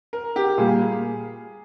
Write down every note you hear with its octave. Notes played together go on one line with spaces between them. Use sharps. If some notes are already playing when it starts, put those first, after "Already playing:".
A#4
G4
A#2 G3 A#3 G#4